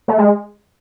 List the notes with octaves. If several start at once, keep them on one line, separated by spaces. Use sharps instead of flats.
A3
G#3